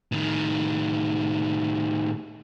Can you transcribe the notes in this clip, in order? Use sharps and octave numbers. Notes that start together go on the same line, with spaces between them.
A2 D#3